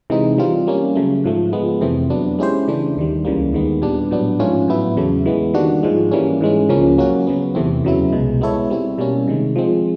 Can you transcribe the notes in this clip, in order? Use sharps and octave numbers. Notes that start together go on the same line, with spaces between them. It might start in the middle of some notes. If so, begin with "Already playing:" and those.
C3 E3 G#3 C4 D#4
E3 G3 C4 F4
G3 A#3 C#4
C#3 F#3 A3
G#2 F3 A3
F3 G#3 B3
F2 C3 E3 A3 C4
F#3 B3 D4
G#3 C#4 E4 G4 C5
C#3 E3 A3 D4
D#2 D#3 G3
C#2 C#3 E3 G3 A#3
D#2 D#3 G#3 B3
A#2 G3 B3 D4
A2 F#3 B3 D4
G#2 F3 A3 C#4 F4
A2 F#3 B3 E4
E2 C#3 F#3 A3
E3 G#3 B3
D#3 G3 A#3 D4 F#4
G#2 F3 G#3
E3 G3 A#3 C#4
G#2 E3 G#3 C#4
C#2 C#3 F3 A#3 C#4
F#3 A#3 C#4 F#4
C#3 F#3 B3
E2 C3 E3 A3 C4
E2 C#3 F#3 B3 E4
C2 B2 G#3
G#3 B3 E4 A4 C#5
G3 C4 E4
B2 G3 A#3 C#4
C3 D#3 G#3
F3 G#3 C4